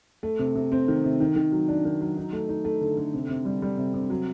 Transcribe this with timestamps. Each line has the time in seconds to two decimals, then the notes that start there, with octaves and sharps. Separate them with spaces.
0.23 A3
0.39 C3
0.56 C3
0.72 C4
0.88 D#3
1.04 C3
1.20 D#3
1.36 D#3
1.52 F#3
1.68 D4
1.85 D#3
2.01 F#3
2.17 D#4
2.33 A3
2.49 D#4
2.65 A3
2.81 D3
2.97 D3
3.14 C3
3.29 C3
3.45 G3
3.62 G3
3.78 C3
3.94 C3
4.10 F#3